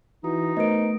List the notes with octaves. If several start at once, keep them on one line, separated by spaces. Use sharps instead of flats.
E3 D#4 F#4
A3 B3 A#4 C5 D#5 D7